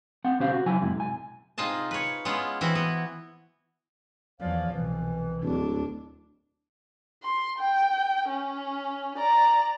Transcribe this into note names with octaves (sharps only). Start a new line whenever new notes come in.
C4 F#5
D2 B2 C#4 G4 C5 F5
F#4
C#3 F#3 E4 G#5
F#2 C3 G#3 E4
B1 G#5
C3 D#4 F4 G#4 A5
B4 C#5
G#3 B3 C#4 E4 F4
E3 C4 E4 F#4
B3
E2 F3 C#5 D5 F5
C2 B2 E3
D1 D#2 D4
C6
G5
C#4
D5 A#5